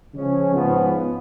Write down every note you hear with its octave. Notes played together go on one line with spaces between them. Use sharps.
C#3 F3 G#3 C#4
G#2 F3 B3